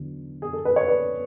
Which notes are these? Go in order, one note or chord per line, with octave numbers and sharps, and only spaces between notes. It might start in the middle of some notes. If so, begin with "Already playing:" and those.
Already playing: E2 D3 F#3
G#4
A4
B4
C#5
B4 D5